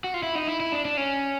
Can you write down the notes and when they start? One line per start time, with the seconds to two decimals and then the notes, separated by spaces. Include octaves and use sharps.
0.04 F#4
0.14 F4
0.23 E4
0.35 D#4
0.48 E4
0.60 E4
0.72 D4
0.85 D4
0.97 C#4